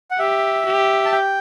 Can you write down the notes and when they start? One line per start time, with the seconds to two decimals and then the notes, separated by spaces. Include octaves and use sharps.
0.11 F#5
0.19 G4 E5
0.66 G4
1.05 A5
1.12 G5